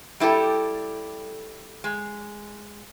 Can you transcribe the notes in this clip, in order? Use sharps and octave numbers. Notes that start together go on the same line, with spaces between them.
G3 E4 G4 A4
G#3